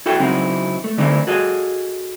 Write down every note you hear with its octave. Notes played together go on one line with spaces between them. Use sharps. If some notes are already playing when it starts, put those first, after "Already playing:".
E4 F#4 A4 E5 G5
C#3 F#3 C4 D#4 E4 F#4
A3
D3 E3 A3 C4 D#4 E4
F#4 G#4 A4 D#5